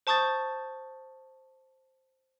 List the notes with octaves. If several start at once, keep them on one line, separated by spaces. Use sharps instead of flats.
C5 A5 C#6 D#6 G6 A6